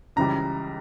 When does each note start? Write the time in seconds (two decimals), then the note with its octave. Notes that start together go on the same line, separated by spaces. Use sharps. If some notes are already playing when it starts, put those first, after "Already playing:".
0.16 C#2 C#3 E3 G3 A#5